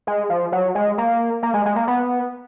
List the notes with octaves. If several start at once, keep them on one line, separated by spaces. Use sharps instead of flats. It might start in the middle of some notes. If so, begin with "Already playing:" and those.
G#3
F3
F#3
G#3
A#3
A#3
G#3
G#3
A#3
B3